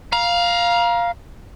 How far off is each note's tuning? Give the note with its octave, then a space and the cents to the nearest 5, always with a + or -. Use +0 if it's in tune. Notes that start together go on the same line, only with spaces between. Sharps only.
F5 +0 A#5 +30